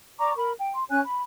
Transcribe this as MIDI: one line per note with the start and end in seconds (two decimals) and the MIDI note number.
0.19 0.32 74
0.19 0.32 82
0.19 0.32 85
0.19 0.32 86
0.36 0.51 70
0.36 0.51 83
0.59 0.73 79
0.74 0.84 84
0.90 1.00 61
0.90 1.00 73
0.90 1.00 80
0.90 1.00 90
1.05 1.22 83